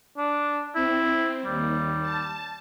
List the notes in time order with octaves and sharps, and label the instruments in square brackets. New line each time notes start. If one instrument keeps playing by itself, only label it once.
[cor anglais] D4
[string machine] C4 [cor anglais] E4
[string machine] D#2 [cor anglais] G3
[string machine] A5